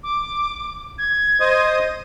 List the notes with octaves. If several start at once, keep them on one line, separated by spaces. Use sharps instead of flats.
D6
G#6
C5 D#5 D#6